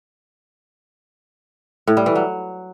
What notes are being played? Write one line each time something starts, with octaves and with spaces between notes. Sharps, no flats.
A2
G3
E3
F#3